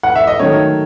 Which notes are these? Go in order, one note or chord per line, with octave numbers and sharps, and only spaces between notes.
F#5
E5
D#5
D#3 F#3 A3 C#5